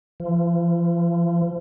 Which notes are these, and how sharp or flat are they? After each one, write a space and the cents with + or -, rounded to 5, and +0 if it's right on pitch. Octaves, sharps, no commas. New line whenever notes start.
F3 -40